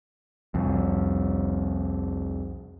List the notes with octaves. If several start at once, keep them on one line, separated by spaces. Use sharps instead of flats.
C2 F2